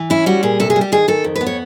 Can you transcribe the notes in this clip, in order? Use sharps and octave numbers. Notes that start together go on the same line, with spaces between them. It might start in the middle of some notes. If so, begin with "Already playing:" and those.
Already playing: E3
C#4 E4
G3 F#4
A#2 G#4
C3 A4
G#4
G3
G4
D#3 G#4
D#3 A4
F2
B4
B3
C#5